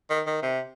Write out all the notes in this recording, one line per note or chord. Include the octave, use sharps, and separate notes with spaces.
D#3
D#3
C3